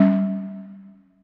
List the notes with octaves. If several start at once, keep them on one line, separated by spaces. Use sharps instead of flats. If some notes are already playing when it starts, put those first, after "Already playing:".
Already playing: G3 C#4